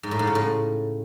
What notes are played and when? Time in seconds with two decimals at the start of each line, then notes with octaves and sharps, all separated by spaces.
0.03 G#2
0.11 A2
0.19 G#2
0.27 C#3
0.35 A2